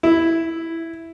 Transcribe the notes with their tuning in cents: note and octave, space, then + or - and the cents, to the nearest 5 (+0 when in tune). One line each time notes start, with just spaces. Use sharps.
E4 +0